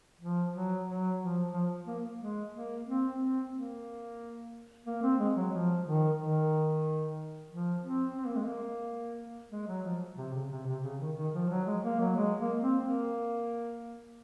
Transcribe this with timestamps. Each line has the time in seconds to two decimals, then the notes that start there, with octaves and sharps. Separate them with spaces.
0.21 F3
0.53 F#3
0.87 F#3
1.20 F3
1.52 F3
1.87 A#3
2.20 G#3
2.53 A#3
2.86 C4
3.20 C4
3.52 A#3
4.86 A#3
5.02 C4
5.19 G#3
5.36 F#3
5.52 F3
5.85 D#3
6.18 D#3
7.51 F3
7.85 C4
8.18 C4
8.26 A#3
8.36 G#3
8.45 A#3
9.51 G#3
9.68 F#3
9.84 F3
10.17 C3
10.33 C#3
10.51 C3
10.66 C3
10.83 C#3
11.00 D#3
11.17 D#3
11.34 F3
11.50 F#3
11.66 G#3
11.84 A#3
12.00 F#3
12.16 G#3
12.39 A#3
12.61 C4
12.83 A#3